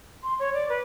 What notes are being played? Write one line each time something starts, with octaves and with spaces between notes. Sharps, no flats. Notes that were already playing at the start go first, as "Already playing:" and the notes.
C6
C#5
D5
B4